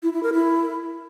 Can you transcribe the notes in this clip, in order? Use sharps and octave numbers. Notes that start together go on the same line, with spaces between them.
E4
E4
A#4
E4